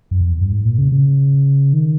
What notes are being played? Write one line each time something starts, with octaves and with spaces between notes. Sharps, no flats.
F#2
F2
E2
G2
G#2
A#2
C#3
C#3
D#3